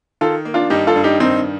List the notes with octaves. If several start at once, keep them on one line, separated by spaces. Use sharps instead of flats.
D#3 F4 A4
A#3
D4 F4
G2 D#4 G4
F4 A4
G2
D#4 G4
D#3 C4 D#4